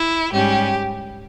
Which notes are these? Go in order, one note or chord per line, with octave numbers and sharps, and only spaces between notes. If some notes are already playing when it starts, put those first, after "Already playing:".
Already playing: E4
G#2 G3 C#4 G4